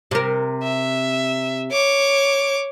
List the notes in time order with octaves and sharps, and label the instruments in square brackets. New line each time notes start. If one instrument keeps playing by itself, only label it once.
[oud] C3 A#4
[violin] E5
C#5 D6